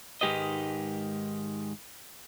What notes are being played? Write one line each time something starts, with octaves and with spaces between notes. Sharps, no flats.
G#2 D#3 G#3 G4 B4 D#5